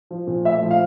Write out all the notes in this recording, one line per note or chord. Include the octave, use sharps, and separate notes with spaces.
F3
A#2
A3 E5
F3
F5